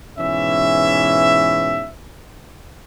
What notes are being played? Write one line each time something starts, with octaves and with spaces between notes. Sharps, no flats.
G#2 B2 E3 C#4 E5